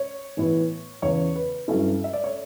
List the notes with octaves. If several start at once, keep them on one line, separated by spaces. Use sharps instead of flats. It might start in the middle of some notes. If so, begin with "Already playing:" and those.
Already playing: C#5
A2 E3 B3 E4
E2 C#3 E3 C#5
B4
G2 F#3 C#4 E4 A4
E5
D5
C#5